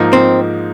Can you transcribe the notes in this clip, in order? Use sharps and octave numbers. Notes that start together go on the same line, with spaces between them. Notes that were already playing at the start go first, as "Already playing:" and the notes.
Already playing: G#2 F3 A#3 D#4
C4